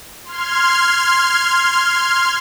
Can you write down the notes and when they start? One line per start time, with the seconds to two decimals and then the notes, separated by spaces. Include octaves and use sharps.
0.25 C6 F6 G#6